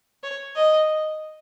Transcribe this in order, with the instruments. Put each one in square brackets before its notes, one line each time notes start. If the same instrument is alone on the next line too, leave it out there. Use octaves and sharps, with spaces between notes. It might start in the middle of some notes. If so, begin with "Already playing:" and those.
[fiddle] C#5
D#5